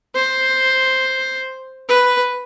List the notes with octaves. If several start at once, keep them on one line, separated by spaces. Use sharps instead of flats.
C5
B4